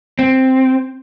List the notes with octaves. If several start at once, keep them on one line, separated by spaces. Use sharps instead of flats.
C4